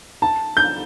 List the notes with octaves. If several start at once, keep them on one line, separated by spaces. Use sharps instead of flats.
A5
G6